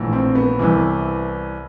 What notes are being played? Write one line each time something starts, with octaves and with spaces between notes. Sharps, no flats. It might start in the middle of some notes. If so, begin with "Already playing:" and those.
Already playing: A#1 A2 E3
C4
B3
C2 C3 E3